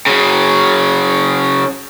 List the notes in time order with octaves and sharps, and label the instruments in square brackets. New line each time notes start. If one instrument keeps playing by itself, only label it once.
[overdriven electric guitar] C#3 F#3